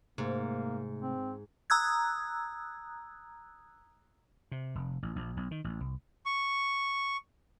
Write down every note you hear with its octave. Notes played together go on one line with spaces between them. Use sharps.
G#2 C3 A3 A#3
C4
A#5 D#6 E6 F#6 G#6
C3
F1
A1
A#1
B1
D#3
A1
C2
C#6